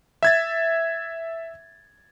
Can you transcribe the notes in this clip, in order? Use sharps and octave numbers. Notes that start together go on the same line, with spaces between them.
E5 G#6 A6